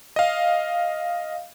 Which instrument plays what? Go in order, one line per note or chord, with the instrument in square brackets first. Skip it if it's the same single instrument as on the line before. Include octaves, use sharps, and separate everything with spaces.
[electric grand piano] D#5 F5